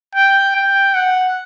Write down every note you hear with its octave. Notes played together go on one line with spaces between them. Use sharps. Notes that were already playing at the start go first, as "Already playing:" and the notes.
G5
G5
F#5